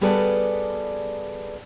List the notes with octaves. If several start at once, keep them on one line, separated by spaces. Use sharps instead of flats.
G3 B3 G#4 A4 D5